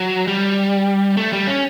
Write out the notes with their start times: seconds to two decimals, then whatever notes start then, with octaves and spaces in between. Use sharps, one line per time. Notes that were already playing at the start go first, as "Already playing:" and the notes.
Already playing: F#3
0.28 G3
1.17 A3
1.33 G3
1.47 C#4